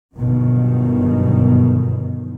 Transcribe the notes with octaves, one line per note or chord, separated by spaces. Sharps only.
G1 F#2 B2 D#3